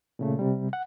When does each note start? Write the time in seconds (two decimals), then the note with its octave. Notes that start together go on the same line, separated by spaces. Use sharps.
0.19 A#2 C#3 A3
0.39 C3 G3
0.73 F#5